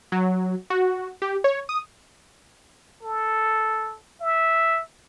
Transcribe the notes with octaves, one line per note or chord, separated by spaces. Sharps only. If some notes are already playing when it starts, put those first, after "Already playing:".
F#3
F#4
G4
C#5
D#6
A4
E5